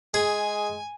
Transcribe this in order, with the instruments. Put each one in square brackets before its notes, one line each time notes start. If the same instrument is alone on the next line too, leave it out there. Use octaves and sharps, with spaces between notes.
[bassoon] G#3 [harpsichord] G#4 [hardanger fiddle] G#5